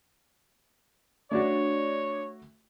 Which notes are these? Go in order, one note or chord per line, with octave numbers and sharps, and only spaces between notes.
A3 D4 F#4 C#5 D5